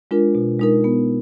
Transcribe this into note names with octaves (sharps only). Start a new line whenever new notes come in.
G#3 D4 F4 A#4
B2
G#3 D#4 A#4
B3